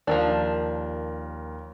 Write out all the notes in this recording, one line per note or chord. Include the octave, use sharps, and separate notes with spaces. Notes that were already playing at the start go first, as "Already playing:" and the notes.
D#2 F3 F#3 D4 A#4